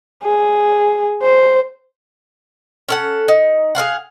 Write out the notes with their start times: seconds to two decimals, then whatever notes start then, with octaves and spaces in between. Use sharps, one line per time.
0.23 G#4
1.22 C5
2.89 C#4 A4 F#5
3.28 D#4
3.75 G#4 A#4 F5 F#5